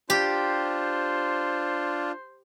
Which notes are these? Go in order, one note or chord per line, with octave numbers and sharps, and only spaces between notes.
D4 F4 G4 C5